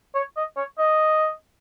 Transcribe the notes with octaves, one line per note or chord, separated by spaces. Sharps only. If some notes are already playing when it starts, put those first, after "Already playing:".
C#5
D#5
C#5
D#5